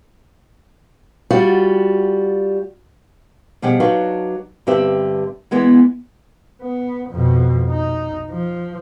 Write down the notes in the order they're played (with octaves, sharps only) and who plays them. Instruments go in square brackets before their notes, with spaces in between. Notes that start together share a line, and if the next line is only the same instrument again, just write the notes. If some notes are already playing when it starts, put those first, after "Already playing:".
[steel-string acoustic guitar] G3 F4 F#4
[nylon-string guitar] B2 F3 G3 G4 G#4 F#5
F#3 D4 D#4 F#4 B4 F5
G2 D3 C4 G4 B4 E5
E3 G#3 B3 D4
[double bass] B3
F2 B2
D#4
F3